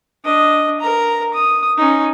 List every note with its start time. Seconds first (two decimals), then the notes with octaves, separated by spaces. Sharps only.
0.24 D4 D#5
0.80 A#4 A#5
1.34 D#6
1.77 C#4 D#4